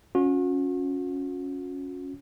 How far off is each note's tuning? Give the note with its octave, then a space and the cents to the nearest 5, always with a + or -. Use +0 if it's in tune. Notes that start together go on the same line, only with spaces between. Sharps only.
C#4 +0 F#4 -40